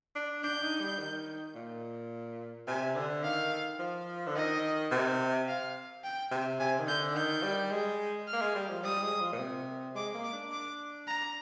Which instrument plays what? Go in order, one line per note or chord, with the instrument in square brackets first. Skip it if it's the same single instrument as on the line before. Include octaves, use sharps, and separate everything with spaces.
[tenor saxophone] D4
[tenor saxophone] D4 [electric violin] G6
[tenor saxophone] D#4
G3
D#3
A#2
[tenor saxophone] C3 [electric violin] G#5
[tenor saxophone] D3
[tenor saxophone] D#3 [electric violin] F5
[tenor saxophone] F3
D3
[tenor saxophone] D#3 [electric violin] D#5
[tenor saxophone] C3
[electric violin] F5
G5
[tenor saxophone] C3
[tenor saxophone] C3 [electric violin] G#5
[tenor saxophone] D#3
[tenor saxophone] D3 [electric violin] G6
[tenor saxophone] D#3 [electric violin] G6
[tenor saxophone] G3
G#3
[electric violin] F6
[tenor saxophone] A#3
G#3
G3
F3
[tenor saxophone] G3 [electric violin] D#6
[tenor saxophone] G#3
F3
A#2
C3
[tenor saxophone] G#3 [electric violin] D6
[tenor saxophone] A#3
[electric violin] D6
[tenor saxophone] D4
[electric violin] D6
A#5